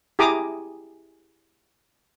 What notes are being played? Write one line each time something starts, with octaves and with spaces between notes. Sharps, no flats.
E4 G4 G#4 A#5 D6 D#6